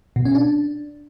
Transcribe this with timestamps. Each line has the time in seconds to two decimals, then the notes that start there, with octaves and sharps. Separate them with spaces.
0.16 B2
0.25 C#4
0.35 D4